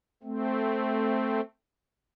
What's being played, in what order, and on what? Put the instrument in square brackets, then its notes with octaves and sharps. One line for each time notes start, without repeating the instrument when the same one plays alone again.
[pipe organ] A3 C4